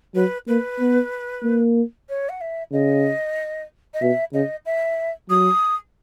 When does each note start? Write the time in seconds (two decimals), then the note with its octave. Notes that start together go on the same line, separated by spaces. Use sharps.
0.15 F#3 B4
0.48 A#3 B4
0.80 B3
1.44 A#3
2.09 C#5
2.29 F#5
2.41 E5
2.72 C#3 D#5
3.94 D#5
4.02 B2 E5
4.33 C#3 D#5
4.66 E5
5.30 F#3 D#6